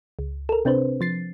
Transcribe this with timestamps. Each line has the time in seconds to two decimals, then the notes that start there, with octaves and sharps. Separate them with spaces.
0.19 C#2
0.49 A4 A#4
0.65 C3 C4 D4 B4 C5
1.01 F3 A6 C7